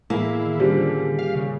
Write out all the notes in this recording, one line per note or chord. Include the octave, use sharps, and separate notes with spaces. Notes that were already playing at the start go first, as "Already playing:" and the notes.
A2 E3 A#3 E4 G#4
D#3
D3 G3 C#4 F4 C5
F5
C#3